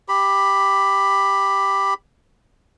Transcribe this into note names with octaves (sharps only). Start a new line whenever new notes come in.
G4 B5